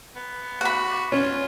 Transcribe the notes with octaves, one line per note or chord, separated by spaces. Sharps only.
B3
F#4 F#5 B5
C#4 F4